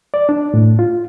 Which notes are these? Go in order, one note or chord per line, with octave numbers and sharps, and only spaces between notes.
D5
D4
A2
F4